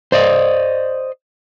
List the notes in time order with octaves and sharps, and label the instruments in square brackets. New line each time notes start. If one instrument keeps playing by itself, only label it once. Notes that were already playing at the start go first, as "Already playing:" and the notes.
[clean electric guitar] C5 D5 D#5